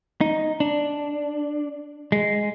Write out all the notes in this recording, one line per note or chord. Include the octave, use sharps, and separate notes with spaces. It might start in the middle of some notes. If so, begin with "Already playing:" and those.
D#4
D4
G#3